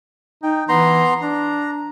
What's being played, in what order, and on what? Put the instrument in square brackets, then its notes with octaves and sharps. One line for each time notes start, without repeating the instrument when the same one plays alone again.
[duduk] D#4 [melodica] G5
[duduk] E3 [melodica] B3 A#5 C6
[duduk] D4 [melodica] A#5